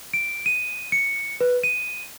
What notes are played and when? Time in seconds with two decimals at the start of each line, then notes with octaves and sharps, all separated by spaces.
0.14 D7
0.46 D#7
0.92 C#7
1.41 B4
1.63 D#7